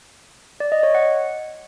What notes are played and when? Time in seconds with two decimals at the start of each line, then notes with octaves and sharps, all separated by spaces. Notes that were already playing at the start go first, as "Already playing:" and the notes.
0.60 D5
0.72 D#5
0.83 C#5
0.95 F#5